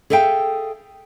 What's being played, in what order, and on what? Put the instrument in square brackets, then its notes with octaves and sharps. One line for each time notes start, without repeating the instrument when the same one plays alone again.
[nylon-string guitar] G#4 A4 E5 F5 G5